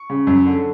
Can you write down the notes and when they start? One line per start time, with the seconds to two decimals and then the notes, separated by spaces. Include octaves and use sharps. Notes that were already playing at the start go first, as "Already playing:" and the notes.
Already playing: C#6
0.10 C#3
0.27 F#2
0.45 D3